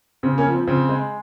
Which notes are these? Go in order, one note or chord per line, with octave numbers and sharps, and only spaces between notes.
C#3 C4
A#3 C#4
F3
C4
C#3 C4
G#3